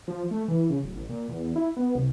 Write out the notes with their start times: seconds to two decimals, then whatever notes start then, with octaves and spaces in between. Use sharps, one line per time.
0.08 F3
0.31 A3
0.48 E3
0.70 C#3
0.83 D1
0.95 A1
1.09 A#2
1.28 E2
1.56 E4
1.77 B3
1.96 C2